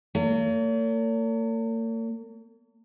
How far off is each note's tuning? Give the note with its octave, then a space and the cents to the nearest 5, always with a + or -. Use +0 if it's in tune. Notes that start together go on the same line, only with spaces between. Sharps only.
A#3 -45 C#5 +45